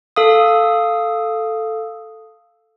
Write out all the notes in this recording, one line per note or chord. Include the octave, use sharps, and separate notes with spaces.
A4 F5 D#6